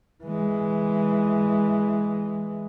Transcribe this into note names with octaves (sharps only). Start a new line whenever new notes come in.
E3 G#3